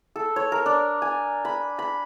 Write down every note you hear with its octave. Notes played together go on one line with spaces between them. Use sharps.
A4
C#5
A#4
D4
G#5
B5
B5